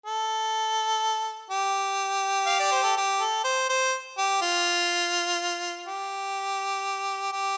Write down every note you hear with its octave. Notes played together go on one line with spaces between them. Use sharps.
A4
G4
F5
D5
C5
A4
G4
A4
C5
C5
G4
F4
G4
G4